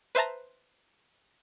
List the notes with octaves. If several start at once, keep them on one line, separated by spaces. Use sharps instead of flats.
B4 C5 E5 A5 A#5